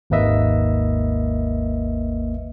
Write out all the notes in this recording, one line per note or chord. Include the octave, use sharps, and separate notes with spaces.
G#1 D#2 A#3 B4 D#5 E5